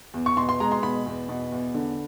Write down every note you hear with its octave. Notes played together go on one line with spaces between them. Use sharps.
E2
C#6
B2 C6
C6
G#3 A#5
C6
B2 B5
E2
B2
E2
D3